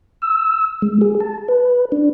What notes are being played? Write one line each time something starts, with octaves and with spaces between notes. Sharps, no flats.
E6
G#3
G#4
A5
B4
D4